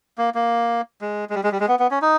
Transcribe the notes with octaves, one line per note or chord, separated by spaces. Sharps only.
A#3
A#3
G#3
G#3
G3
G#3
G3
G#3
B3
B3
C#4
D#4